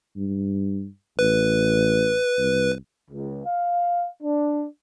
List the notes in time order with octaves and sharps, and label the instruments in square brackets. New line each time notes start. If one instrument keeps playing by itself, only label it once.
[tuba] G2
[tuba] A1 [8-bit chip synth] B4
[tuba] C2
[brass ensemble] C#2
F5
D4